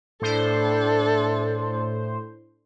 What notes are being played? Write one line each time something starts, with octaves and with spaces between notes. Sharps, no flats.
A2 D4 A4 C5